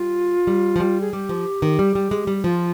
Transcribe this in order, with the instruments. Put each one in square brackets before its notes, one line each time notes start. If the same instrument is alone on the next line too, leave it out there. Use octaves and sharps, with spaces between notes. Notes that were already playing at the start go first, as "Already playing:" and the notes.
Already playing: [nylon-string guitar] G3 [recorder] F4
[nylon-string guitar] G3
F3
G3
[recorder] G#4
[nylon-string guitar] G3 [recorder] G4
[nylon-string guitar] F3
D#3
G3
G3
G#3
G3
[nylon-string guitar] F3 [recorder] F4